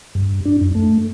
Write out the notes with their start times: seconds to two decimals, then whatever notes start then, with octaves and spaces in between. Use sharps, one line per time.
0.15 G2
0.45 D4
0.61 F#2
0.75 A3